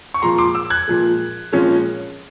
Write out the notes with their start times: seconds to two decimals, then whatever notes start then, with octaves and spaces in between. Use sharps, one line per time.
0.14 C#6
0.22 A#2 F3 G#3 A#5 C6
0.38 C6 D6
0.55 D6 E6
0.70 F#6 G#6
0.88 A#2 F3 G#3
1.52 A#2 F3 G#3 C#4